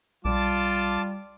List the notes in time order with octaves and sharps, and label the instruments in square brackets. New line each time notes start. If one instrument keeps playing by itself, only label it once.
[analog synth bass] B1 [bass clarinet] G3 [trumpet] F4 [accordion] A5 D6